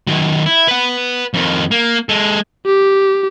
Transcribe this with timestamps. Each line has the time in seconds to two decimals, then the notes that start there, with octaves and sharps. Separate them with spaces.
0.07 D#3 F#3
0.46 E4
0.68 B4 F#5
1.34 F2 D#3
1.71 A#3
2.09 G#3 A4
2.66 G4